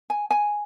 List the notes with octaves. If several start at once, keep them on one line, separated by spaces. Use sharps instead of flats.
G#5
G#5